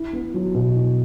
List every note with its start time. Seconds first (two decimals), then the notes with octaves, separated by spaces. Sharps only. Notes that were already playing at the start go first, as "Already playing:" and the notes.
Already playing: E4
0.13 B3
0.34 F#3
0.54 B2
0.76 E4